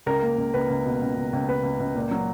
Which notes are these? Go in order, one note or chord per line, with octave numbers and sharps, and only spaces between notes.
C#2 A#4
A#3
C#2
C#2 B4
C#2
B2
C#2
C#2
C#2
C#2 B4
C#2
C#2
A#2
F#3